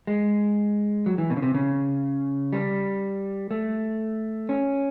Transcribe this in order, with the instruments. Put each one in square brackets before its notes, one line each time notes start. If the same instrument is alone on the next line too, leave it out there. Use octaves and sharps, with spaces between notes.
[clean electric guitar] G#3
F#3
E3
B2
C#3
C3
C#3
G3
A3
C#4